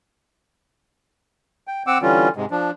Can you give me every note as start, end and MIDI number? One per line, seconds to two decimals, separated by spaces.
1.67 1.83 79
1.87 1.98 60
1.87 1.98 78
1.87 1.98 86
1.87 1.98 88
2.02 2.29 50
2.02 2.29 52
2.02 2.29 55
2.02 2.29 61
2.02 2.29 65
2.36 2.45 44
2.36 2.45 48
2.36 2.45 56
2.51 2.71 53
2.51 2.71 62